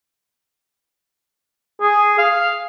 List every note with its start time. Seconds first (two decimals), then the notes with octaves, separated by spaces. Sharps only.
1.82 G#4
2.18 F5